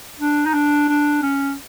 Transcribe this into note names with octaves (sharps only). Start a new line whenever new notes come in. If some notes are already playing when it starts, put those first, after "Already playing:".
D4
D#4
D4
D4
C#4